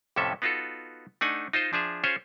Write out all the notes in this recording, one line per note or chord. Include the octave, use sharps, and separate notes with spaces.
F2 A2 C3 C#4 A4 E5
B3 D#4 F4 F#4 A4
A3 D4 D#4 F#5 G#5
D#4 F4 C5 D#5
F3 D4 G#4 E5
C#4 F4 G#4 C5 C#5